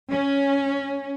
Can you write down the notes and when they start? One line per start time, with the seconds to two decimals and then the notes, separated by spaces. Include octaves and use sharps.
0.11 C#4